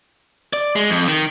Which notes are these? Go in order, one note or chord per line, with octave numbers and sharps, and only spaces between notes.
D5
G#3
F2
D#3